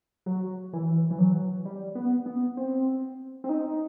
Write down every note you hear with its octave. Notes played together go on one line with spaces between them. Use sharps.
F#3
E3
E3
F#3
G3
B3
B3
C4
C4
D#4